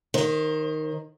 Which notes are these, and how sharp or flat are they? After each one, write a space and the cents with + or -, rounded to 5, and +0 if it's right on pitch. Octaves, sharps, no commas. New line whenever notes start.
D#3 +0 C5 +30